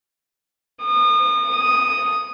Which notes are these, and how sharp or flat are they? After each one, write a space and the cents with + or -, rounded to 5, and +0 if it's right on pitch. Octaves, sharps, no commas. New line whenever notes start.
D#6 -35
D#6 +0